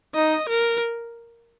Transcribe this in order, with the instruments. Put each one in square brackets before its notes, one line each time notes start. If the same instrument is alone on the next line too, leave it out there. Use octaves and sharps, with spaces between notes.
[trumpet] D#4 [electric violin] D#5
[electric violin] A#4